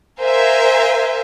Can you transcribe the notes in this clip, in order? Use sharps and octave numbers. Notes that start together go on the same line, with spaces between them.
A#4 C5 E5 F5 G#5